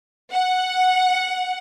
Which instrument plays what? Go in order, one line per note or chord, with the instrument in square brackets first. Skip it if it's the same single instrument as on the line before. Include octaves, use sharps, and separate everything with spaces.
[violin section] F#5